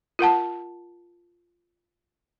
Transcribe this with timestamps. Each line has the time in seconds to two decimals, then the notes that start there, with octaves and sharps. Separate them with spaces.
0.19 F4 A#4 F#5 A5